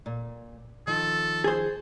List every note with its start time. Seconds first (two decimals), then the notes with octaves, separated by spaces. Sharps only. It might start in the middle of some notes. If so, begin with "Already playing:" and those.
0.06 A#2
0.87 D#3 F3 A4
1.44 G#4 C5